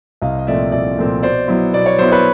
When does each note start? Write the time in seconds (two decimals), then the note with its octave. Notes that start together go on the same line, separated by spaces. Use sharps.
0.22 C2 D#5 F5
0.39 D#5
0.47 A#2 F3 A3 C4 D5 E5
0.72 C2 D5 E5
0.98 A#2 F3 A3 C4
1.23 B2 C5 D5
1.48 F#3 B3 E4
1.74 B2 D5
1.86 C#5
1.98 F#3 B3 E4 C5
2.12 B4 C#5